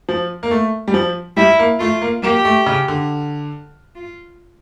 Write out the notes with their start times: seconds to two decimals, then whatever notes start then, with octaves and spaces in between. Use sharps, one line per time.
0.09 F3
0.43 A#3
0.51 A3
0.88 G3
0.94 F3
1.37 G3 E4
1.59 A#3
1.80 A3 F4
2.01 A#3
2.23 A#3 G4
2.45 A3
2.66 C#3
2.88 D3
3.96 F4